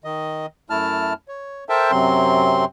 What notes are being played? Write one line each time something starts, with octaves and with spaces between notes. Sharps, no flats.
D#3 D#5
F#2 A3 E4 A5 F6
C#5
A4 A#4 C5 E5 G5 A5
F#2 C3 F#3 C4 C6